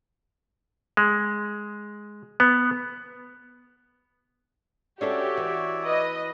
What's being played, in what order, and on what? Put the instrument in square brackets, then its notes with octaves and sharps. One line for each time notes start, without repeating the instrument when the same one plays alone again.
[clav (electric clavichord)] G#3
B3
[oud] C#4 D4 A4 [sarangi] F#4 [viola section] G4 [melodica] C#5 D5 E5
[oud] E3
[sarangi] B4 [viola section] D#5